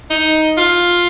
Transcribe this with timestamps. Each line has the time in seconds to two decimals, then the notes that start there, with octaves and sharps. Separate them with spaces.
0.10 D#4
0.57 F4